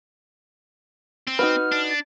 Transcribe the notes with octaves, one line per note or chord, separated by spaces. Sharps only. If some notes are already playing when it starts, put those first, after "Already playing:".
C4
D#4 F#4 B4 F6
D4
A6